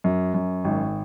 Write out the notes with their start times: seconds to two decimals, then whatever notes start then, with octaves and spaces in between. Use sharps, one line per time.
0.04 F#2
0.34 F#2
0.65 G#1